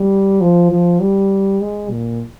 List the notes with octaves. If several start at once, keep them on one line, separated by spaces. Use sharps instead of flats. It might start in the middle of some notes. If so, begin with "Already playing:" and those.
Already playing: G3
F3
F3
G3
G#3
A#2